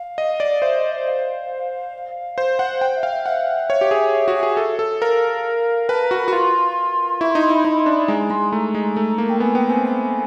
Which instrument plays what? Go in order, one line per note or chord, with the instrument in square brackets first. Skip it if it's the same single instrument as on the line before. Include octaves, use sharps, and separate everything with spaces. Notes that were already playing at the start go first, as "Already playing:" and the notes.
Already playing: [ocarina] F5
[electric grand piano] D#5
D5
[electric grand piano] C5 [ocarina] E5
[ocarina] D#5
E5
F5
[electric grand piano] C5
F#5
[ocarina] F#5 [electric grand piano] G5
[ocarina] E5
[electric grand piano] F5
[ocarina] E5
[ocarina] E5 [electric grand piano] F#5
[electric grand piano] C#5
G4
G#4
F#4
G#4
A4
A4
[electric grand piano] A#4 [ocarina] F5
[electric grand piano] B4 [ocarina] A5
[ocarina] A#5
[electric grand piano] F#4
[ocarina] B5
[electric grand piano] F#4
[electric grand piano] F4 [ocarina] C6
[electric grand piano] E4 [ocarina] C#6
[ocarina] C6
[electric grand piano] D#4
[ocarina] C6
[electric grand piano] E4 [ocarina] B5
[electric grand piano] D#4 [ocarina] B5
[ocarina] C6
[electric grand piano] D4
[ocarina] B5
[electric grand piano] G#3 [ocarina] A#5
[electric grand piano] G#3 [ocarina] C6
[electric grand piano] A3 [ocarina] A#5
[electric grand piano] G#3
A3
A#3
[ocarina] G5
[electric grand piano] B3 [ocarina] G#5
[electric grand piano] B3 [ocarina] G5
[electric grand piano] C4 [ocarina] G#5
[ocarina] G#5